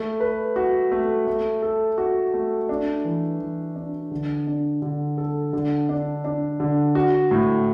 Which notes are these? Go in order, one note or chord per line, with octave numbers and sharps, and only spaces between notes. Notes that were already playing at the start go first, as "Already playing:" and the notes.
Already playing: A3
B4
F#4
A3
A3
A4
F#4
A3
D4
E3
E3
D4
D3
D4
D3
A4
D3
D4
D4
D3
F#4
A2